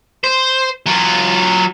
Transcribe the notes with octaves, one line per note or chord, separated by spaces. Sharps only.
C5
F#3 F4